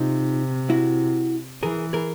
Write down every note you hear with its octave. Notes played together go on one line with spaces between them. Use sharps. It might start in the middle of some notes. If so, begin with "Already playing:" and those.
Already playing: C3 D#4 F4
E4 F#4
E3 G#4 A#4
G#4 A#4